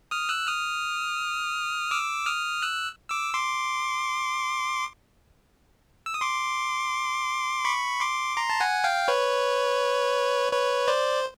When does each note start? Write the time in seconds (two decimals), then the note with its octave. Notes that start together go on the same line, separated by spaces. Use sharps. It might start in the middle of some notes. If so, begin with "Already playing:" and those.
0.11 D#6 F6
0.29 E6 F#6
0.47 D#6 F6
1.91 D6 E6
2.26 D#6 F6
2.62 E6 F#6
3.10 D6 E6
3.34 C6 D6
6.06 E6
6.14 D#6
6.21 C6 D6
7.65 B5 C#6
8.00 C6 D6
8.37 A#5 C6
8.50 A5
8.60 F#5 G#5
8.84 F5 G5
9.08 B4 C#5
10.52 B4 C#5
10.88 C5 D5